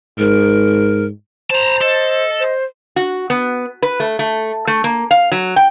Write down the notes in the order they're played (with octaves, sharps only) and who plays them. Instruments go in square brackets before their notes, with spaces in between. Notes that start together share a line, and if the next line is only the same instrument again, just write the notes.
[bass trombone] G#2 [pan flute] A#4
[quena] C5 [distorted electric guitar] A5 A#5
[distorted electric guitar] A4 [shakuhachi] D#5
[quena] C5
[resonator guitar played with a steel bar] F#4
B3
B4
A3
A3
A3
A#3
F5
F#3
G5